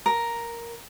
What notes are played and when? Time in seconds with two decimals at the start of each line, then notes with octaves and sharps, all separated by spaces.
0.06 A#4